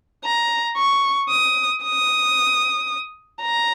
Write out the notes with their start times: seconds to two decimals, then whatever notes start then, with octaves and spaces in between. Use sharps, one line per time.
0.24 A#5
0.77 C#6
1.30 D#6
1.84 D#6
3.42 A#5